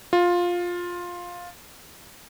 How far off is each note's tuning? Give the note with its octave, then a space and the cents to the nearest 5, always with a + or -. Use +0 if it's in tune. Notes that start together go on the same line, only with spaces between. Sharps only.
F4 +10